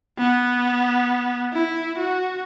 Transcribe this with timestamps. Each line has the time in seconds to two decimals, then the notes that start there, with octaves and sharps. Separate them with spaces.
0.18 B3
1.53 E4
1.98 F#4